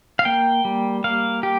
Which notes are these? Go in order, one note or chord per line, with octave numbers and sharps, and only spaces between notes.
F5
A#3 G5
G3
A#3 F5
G4